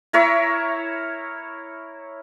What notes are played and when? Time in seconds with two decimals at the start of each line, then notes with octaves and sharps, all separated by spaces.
0.13 E4 A#4 C#5 E5